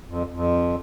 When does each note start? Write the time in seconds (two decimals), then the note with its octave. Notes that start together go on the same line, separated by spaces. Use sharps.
0.08 F2
0.32 F2